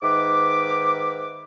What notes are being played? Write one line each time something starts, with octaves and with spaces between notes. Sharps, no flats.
G#2 D#3 B4 E5 D6